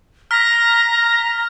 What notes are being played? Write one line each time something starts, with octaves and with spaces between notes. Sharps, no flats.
A#5 F6 B6